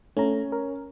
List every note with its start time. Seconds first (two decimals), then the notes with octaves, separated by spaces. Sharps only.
0.17 A3 C#4 A#5
0.52 A#4